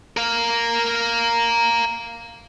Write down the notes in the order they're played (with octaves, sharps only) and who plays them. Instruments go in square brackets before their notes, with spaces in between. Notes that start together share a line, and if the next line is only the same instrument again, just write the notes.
[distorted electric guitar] A#4 F5